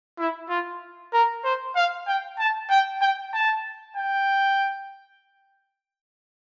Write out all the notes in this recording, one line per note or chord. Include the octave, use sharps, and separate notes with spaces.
E4
F4
A#4
C5
F5
G5
A5
G5
G5
A5
G5